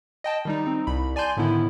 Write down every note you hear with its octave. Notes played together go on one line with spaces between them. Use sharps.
D#5 G5 A5
D#3 G3 D#4
C4 D#4
C2 B5
D5 G#5 A5 C6 G6
A2 D3 D#3 B3 E4